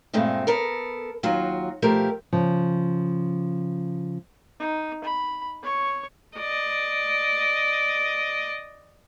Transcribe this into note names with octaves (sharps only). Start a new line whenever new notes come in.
G2 A#2 G#3 A3 C4
B3 A4 A#4
D#2 F#3 F4 F#4
B2 F3 A3 G4 A#4
C#3 F3
D#4
B5
C#5 C#6
D5 D#5